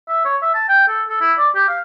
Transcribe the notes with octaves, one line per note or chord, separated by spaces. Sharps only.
E5
C#5
E5
A5
G5
A4
A4
E4
D5
G4
F5